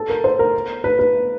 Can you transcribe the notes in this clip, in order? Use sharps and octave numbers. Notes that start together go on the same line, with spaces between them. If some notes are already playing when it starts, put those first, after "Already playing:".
Already playing: A4
A#4
C5
A#4
B4
B4